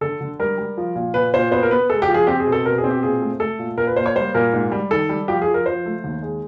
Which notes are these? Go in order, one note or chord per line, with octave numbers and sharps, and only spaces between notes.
D3 A4
D3
G3 A#4
G3
F3
A#2
A#2 B4
A#2 C5
B3 C5
A#4
B3 B4
G#3 A4
G4
F3
G#4
C4 G4
G#4
B2
A4
B2 A#4
G#4
C4
G4
A#2 G#4
A3
A3 A4
A#2
A#2 A#4
B4
A#3 C5
C#5
G3 C5
A#2 A#4
G#2
G3
D#3 A4
G3
F3 G4
G#4
F3
A#4
F3 C5
A3
D#2
G#3